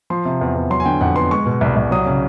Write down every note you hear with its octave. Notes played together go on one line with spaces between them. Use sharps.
F3 C6
C3
E2
E2
F#3 C6
G#5
D3 G5
F2 F#5
B3 C6
G#3 C#6
B2
C2
C2
F#3 D#6
C#3